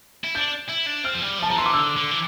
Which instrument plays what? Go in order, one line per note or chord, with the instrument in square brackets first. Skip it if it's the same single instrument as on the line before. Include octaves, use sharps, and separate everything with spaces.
[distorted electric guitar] E4
[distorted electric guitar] D4 [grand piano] G6
[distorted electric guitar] E4
D4
[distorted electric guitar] C4 [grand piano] F6
[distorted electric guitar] F3
G3
F3
[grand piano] A5
[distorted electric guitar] F3 [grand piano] A#5
[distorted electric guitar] E3 [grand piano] C6
[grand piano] D6
[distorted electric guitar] D3 [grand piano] E6
[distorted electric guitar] D3
E3